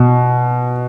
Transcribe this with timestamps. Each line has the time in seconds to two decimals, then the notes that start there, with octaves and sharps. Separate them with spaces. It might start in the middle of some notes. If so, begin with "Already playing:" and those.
Already playing: B2